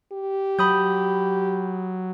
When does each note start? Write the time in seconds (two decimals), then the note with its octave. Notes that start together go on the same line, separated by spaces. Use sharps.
0.12 G4
0.59 F#3 B5 D#6 G6